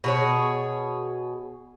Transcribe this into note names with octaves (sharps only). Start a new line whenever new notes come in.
B2 G#4 C#5